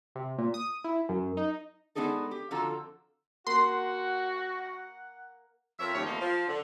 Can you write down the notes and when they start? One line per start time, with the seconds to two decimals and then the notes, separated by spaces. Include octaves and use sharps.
0.16 C3
0.38 A#2
0.54 D#6
0.84 E4
1.09 F#2
1.37 D#4
1.95 G#3 B3 D4 D#4 G#4 A4
2.31 G4
2.51 F2 D3 F4 F#4 A4 A#5
3.47 A#3 F#4 F#5 C6
5.79 F2 F3 A#4 C#5 E5
5.94 D#2 G#2 F3 G3 C#4 C#5
6.06 E2 B2 F3 A3 A#3 D#5
6.20 F3
6.48 D3